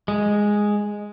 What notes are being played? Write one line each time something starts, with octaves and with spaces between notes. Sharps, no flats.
G#3